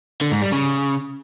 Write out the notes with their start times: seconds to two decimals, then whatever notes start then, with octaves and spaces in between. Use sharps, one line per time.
0.21 D3
0.32 G#2
0.42 G3
0.52 C#3